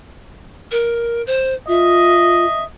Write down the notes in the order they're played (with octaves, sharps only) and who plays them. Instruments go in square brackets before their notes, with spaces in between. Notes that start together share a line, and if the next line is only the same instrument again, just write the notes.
[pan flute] A#4
C5
[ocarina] F4 [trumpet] D#5 [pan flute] E5